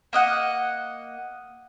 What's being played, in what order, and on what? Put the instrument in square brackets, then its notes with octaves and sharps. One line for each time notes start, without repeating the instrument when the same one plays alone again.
[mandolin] A#3 D#5 F#5